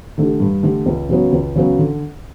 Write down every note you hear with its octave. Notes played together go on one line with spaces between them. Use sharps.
D3 A3 D4 G4
G2
D3 A3 D4 G4
C#2
C#3 F#3 B3
C#2
C#3 F#3 B3
D3